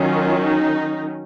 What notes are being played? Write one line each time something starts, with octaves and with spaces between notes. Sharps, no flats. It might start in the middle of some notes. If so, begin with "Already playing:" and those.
Already playing: D#3 F#3 C#4 F4
D#4